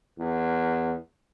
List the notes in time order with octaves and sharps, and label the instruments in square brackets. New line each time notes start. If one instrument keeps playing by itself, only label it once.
[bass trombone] E2